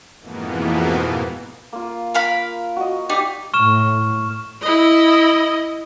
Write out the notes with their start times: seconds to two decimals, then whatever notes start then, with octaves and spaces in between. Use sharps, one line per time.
0.20 F2 G#2 B2 E3 A#3 B3
1.73 A#3 F4
2.14 A#4 F5 B5
2.76 F#4 D#5
3.10 D#4 G4 D5
3.54 A2 C#6 F6 E7
4.61 E4 D#5